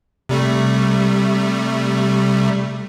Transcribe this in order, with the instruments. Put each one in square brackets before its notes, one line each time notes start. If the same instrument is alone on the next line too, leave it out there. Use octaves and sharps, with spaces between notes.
[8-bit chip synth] C3 G3 A3